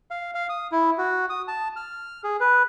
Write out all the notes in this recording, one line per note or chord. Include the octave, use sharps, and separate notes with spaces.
F5
F5
D#6
E4
F#4
D#6
A5
F6
G#4
B4